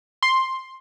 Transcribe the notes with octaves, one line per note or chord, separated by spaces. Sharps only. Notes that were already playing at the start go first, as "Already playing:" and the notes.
C6